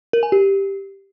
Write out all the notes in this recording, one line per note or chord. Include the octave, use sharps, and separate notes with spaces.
A#4
G#5
G4